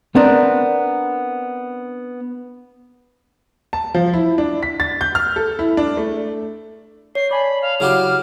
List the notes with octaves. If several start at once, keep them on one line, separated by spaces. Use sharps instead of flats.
B3 C4 D4 A#4
A5
F3
E4
D4
B6
A6
G6
F6
A4
E4
D4
A3
C#5 C7
D5 G#5 A5 B5
F5
C#3 F#3 E4 F#4 G4 F6